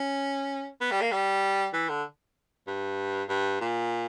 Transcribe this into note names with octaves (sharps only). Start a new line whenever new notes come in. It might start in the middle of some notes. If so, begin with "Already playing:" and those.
Already playing: C#4
B3
G3
A#3
G3
E3
D3
G2
G2
A#2